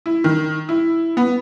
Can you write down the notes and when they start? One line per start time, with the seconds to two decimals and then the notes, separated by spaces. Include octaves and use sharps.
0.06 E4
0.24 D#3
0.69 E4
1.17 B3